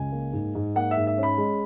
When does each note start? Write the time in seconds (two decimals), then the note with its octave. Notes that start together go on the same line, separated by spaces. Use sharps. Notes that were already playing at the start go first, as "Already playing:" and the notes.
Already playing: C#2 G#5
0.12 A#3
0.33 G#2
0.55 G#2
0.75 A#3 F#5
0.91 E5
0.97 G#2
1.07 E5
1.18 C#4
1.23 B5
1.38 G#3